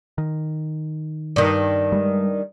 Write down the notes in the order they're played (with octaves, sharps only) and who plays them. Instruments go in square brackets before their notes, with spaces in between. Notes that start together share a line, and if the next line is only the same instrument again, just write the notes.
[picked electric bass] D#3
[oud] G2 D#3
[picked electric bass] G3 G#3